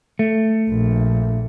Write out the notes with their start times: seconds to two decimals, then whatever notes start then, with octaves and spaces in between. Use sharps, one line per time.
0.19 A3
0.69 A#1